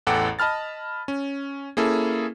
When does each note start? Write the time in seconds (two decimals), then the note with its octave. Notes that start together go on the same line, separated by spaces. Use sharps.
0.07 A1 E2 A4 F#5 G5 D6
0.39 D#5 A5 B5 F6 A6
1.08 C#4
1.77 A#3 C#4 E4 G#4 A4